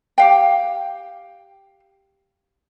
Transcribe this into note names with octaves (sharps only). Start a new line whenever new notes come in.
G4 F5 G5